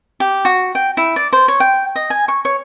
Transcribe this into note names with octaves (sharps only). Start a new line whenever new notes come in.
G4
F#4
G5
E4
D5
C5
C#5
G5
D#5
G#5
C#6
C#5